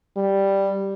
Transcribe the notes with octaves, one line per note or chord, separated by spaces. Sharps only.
G3